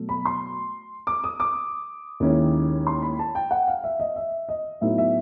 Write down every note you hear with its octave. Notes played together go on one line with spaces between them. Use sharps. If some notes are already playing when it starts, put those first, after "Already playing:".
Already playing: B2 F#3 A3
B5
C6
D6
D#6
D6
D#2 D#3 G#3 C#4 E4
C6
B5
A5
G5
F#5
F5
E5
D#5
E5
D#5
A2 F#3 B3 D#4 E5
E5